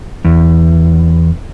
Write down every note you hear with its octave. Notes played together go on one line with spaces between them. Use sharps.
E2